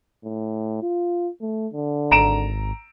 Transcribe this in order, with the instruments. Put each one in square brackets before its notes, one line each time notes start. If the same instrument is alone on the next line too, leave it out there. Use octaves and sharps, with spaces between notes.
[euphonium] A2
F4
A3
D3
[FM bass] G#1 [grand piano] A#5 D7 E7